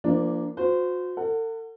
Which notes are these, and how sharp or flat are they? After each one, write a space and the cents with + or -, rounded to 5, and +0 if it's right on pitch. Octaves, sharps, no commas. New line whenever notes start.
F3 -30 A#3 +0 D4 +0
F#4 -40 C5 -25
A4 +40 F#5 +0